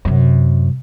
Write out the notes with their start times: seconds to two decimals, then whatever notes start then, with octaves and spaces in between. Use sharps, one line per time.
0.05 F#2 C3